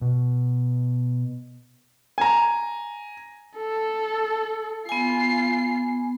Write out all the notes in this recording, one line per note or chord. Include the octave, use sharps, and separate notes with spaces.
B2
G#5 A#5
A4
B3 F4 G#5 C7